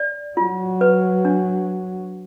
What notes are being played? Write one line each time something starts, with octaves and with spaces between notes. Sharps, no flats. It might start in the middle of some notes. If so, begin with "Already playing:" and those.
Already playing: D5
F#3 F4
B4
D4